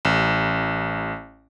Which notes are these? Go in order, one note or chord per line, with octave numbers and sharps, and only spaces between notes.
A1